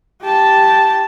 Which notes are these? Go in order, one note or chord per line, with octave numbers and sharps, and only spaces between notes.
G4 A5